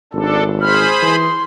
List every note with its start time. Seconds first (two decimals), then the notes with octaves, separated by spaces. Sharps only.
0.13 G#1 D4 A4
0.61 G#4 C5 B5 F6
1.02 E3 C6